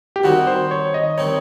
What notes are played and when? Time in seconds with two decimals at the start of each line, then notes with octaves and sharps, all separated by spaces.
0.16 G4
0.24 D#3 G3 C4 D#4 F#4
0.47 C5
0.71 C#5
0.94 D#5
1.18 D#3 G3 C4 D#4 C#5